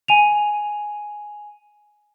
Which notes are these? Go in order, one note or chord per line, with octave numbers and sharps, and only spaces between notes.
G#5 D#7 F7